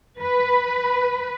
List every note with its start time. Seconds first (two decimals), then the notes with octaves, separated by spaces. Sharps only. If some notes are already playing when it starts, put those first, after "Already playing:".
0.21 B4